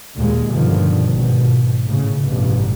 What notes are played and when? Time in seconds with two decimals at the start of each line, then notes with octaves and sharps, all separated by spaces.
0.16 D#2 A#2 G#3
0.48 G2 B2 D3 D#3 F3
1.14 G#1 B2
1.85 A2 C#3
2.22 A1 G2 B2